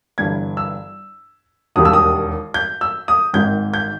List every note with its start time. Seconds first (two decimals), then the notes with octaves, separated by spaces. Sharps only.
0.18 G1 G2 E3 G#6
0.57 E6
1.76 E1 D#2 D#3 G3 D#6
1.85 E6
1.93 D#6
2.54 G6
2.81 E6
3.08 D#6
3.33 G#1 G#2 D#3 G6
3.74 G6